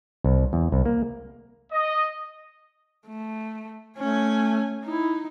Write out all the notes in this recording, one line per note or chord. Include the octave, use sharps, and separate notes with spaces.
C2
E2
C2
A#3
D#5
A3
A3 C#4 G#5
D#4 E4